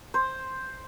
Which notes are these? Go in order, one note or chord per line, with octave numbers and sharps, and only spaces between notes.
C5